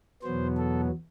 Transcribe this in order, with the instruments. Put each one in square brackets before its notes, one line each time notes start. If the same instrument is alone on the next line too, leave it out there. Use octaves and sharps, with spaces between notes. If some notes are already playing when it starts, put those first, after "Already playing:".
[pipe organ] E2 B2 F#3 B3 C5
A4